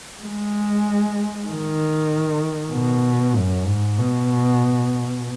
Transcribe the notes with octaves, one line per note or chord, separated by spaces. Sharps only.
G#3
D#3
B2
F#2
G#2
B2